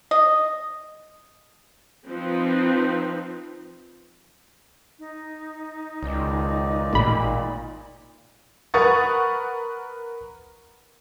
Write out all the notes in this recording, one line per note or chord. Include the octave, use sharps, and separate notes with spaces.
D#5
F3 C4 D#4 B4
D#4
C#2 D#3 G#3 D5
A1 A#2 B5
A#4 B4 F#5 C#6 D#6 A6